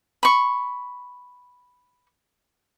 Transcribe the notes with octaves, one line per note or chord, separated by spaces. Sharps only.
B5 C#6